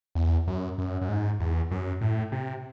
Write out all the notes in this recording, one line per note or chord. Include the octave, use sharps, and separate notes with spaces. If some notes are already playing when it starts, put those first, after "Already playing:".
E2
F#2
F#2
F#2
G#2
E2
F#2
A2
C3